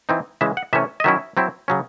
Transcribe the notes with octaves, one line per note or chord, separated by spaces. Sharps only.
E3 C4 D#4
C#3 E3 G#3 E5
F#5
C3 E3 A3 C#4 E5
D#5
D#3 F#3 C#4 E4 E5
F#3 C4 E4
C#3 F#3 C#4